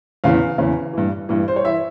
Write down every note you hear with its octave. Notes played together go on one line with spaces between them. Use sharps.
E2 C#3 E3 F5
E2 C#3 E3
G2 E3
G2 E3
C5
C#5
E3 E5